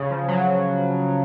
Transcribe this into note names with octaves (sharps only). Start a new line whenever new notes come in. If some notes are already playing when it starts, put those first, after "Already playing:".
Already playing: C#3
F3
F#3